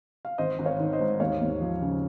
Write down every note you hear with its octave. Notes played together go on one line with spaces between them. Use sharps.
F5
G#1 C5 D#5
G#1
C#5 F5
D#3
C5 D#5
G#2
D#2 C#5 F5
D#2
F3
C#3